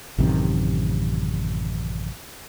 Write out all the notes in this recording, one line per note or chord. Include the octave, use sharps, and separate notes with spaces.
A1 F#2 C3 D#3